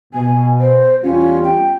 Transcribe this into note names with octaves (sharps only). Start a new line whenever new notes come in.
B2 G#5
C5
E2 G3 C#4 F4
G5